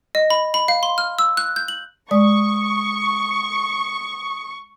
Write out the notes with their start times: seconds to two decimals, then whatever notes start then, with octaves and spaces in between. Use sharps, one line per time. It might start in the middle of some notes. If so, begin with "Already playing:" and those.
0.15 D#5
0.30 B5
0.54 B5
0.68 F5
0.83 C6
0.98 F6
1.19 E6
1.37 F#6
1.56 G6
1.68 F#7
2.11 G#3 D5 C#6 D#6